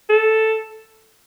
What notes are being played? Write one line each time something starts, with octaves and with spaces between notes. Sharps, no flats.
A4